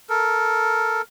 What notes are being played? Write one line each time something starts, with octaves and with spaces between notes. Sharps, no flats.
A4 A#4